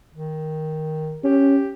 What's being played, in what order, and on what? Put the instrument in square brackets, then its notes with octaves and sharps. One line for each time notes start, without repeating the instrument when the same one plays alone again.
[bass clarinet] D#3
[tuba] C#4 [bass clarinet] G4